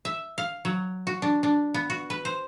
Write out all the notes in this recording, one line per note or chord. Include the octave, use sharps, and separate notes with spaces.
E5
F5
F#3
F#4
D4
D4
B3
F#4
B4
C5